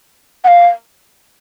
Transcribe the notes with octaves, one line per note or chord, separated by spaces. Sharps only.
F#5
F5